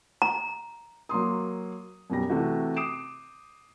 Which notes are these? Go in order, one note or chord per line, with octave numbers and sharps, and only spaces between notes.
A#5
F#3 A#3 C6 D#6
F#2 B2 G3 A#6
C3 E3 A3 F#4
D6 D#6 C7 D7 E7